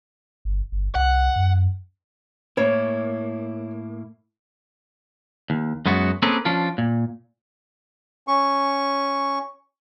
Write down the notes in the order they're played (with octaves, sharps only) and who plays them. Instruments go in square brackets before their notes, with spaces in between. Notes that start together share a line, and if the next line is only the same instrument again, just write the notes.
[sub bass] G1
G1
[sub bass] C2 [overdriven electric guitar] F#5
[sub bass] F#2
[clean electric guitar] A2 A#3 E4 [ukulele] C#5
[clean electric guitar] D#2
F#2 G#3 B3 F#4
A#3 C4 C#4 G#4 A4 B4
F3 C#4 D4 F4
A#2
[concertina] C#4 C#6